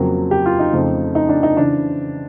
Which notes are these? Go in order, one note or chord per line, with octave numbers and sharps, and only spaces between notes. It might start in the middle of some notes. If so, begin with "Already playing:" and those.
Already playing: F2 C#3 F#3 A#3
G4
F4
D#4
F2 C#3 F3 A3
D#4
D4
D#4
C#3 E3 D4